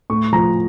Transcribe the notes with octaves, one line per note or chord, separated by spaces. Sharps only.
A2 C#6
F3 A#5